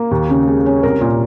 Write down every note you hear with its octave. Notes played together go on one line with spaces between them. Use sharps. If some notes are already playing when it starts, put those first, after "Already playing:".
Already playing: A#3
D#2
C#3
G#3
C#4
C2 A#4
A#2